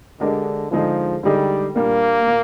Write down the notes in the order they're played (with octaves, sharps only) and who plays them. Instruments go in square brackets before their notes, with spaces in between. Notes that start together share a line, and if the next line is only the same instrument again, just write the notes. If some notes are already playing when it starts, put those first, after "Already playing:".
[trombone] D3 [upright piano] G#3 D4 G4 A#4 D#5
[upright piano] D3 G#3 D#4 G#4 [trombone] F3
[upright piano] D3 G#3 D#4 G#4 [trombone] G3
[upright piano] A#2 G3 D4 [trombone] A#3
[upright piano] A#2